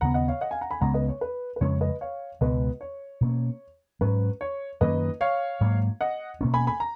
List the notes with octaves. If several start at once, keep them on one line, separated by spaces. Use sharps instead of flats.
D#2 C#3 G#3 B3 F#5 A#5
D#5 F#5
C#5 F5
D#5 F#5
F5 G#5
F#5 A#5
G#5 B5
C#2 C#3 G#3 B3 F#5 A#5
B4 D#5
C#5
B4
B4
F2 C#3 G#3 C#4 C#5
B4 D#5
C#5 F5
C#2 B2 G#3 B4 D#5
C#5
B2 A#3 C#4
G#2 F#3 C#4 B4
C#5
F#2 D#3 A#3 C#4 B4 D#5
C#5 F5
G#2 F#3 A#3
D#5 F#5
B2 A#3 C#4
G#5 B5
G#5 B5
A#5